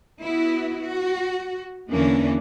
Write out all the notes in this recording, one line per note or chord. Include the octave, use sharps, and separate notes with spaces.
B3 E4 F#4
F#4
E2 D3 E3 A#3 C#4 D4